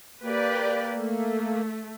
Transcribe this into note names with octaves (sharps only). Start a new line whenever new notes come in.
A#3 G4 B4 D5
A3